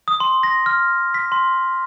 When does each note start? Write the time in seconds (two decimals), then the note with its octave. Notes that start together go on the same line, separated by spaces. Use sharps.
0.08 D#6
0.20 C6
0.43 A#6
0.66 F6
1.14 B6
1.32 C6